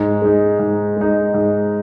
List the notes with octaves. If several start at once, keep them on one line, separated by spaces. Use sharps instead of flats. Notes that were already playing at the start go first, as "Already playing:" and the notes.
Already playing: G#2
G#3 D#4
G#2
G#3 D#4
G#2